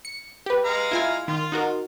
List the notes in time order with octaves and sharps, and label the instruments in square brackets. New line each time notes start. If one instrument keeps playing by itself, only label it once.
[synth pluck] C#7
G4 B4
[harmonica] G#3 F5 A#5
[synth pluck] E4 F4 G#5
[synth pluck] D#3 [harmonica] F4
[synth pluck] D#4 F#4 A#4